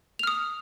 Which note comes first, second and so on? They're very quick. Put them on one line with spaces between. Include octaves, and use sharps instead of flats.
F7 F6 D#6